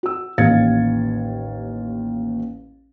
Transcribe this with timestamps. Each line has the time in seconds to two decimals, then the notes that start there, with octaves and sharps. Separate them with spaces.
0.03 F#4 E6
0.38 A1 D#2 F5 G#6 A6 C#7